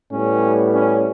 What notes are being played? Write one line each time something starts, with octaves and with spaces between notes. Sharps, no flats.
A2 G3 B3 C#4
C#4